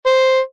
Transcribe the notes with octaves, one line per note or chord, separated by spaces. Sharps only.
C5